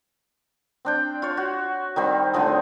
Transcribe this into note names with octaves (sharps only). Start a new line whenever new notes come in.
C4 D4 G5
F4 C#5
F#4
D#3 G3 C4
A2 D3 F3 G#4